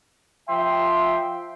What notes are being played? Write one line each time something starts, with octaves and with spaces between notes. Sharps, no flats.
F3 E5 G5 C6